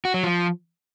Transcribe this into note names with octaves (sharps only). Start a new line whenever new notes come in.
F#4
F#3
F3